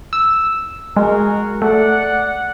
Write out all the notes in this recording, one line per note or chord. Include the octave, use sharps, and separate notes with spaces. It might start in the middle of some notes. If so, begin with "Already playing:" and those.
E6
G#3 F#4 G#4 A#4
A3 D5 F#5